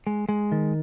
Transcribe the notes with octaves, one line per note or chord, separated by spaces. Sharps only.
G#3
G#3
D#3